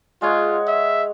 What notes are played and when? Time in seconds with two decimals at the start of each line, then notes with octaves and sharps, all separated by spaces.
0.22 G#3 F4 C#5 F#5
0.67 E5